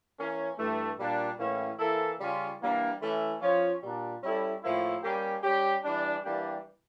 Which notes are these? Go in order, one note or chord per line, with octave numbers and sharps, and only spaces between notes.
E3 A#3 C#4
G2 E3 A3
A#2 G3 A#3 D4
A2 E3 A#3 C#4
E3 A#3 E4 A4
C#3 G3 C#4 F4
E3 G3 A#3 D4
E3 A3 C#4 E4
F3 C#4 F4 C#5
A#2 G3 D4
G3 C#4 E4 A4
A2 F3 A#3 E4
G3 A#3 C#4 G4
G3 C#4 G4
E3 G3 D4
E3 G3 A#3 D4 G4